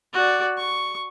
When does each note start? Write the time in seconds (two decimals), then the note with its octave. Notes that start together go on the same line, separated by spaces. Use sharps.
0.14 F#4 D5
0.58 C#6